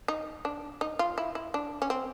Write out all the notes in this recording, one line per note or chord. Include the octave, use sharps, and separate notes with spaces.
D#4
D4
D#4
F4
E4
E4
D4
C#4
C4